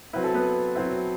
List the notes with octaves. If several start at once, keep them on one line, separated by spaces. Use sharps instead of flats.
F#3 C4 E4 B4
A4
B3 B4
F#3 C4 E4